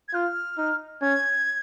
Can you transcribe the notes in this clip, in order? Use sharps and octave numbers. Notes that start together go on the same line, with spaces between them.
G#6
F4 F6
D#4
C#4 G#6